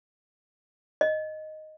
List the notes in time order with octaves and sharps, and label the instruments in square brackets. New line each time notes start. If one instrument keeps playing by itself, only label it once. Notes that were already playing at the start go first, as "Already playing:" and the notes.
[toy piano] D#5